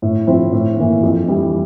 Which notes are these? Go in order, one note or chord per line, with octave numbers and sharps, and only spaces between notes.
A2
F3 C4 E4
A2
E3 A#3
F2
E3 G3